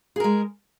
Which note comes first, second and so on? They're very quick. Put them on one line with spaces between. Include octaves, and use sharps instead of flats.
G#4 A#4 G#3